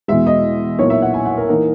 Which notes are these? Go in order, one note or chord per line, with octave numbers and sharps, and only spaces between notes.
E2 B2 G#3 E5
D#5
B1 A#2 A#3 E4 C#5
E5
F#5
G#5
F#5
A#4
E3 A#3 D#4 A#4